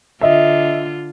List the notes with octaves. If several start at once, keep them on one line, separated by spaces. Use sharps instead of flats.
D3 F4 D#5 E5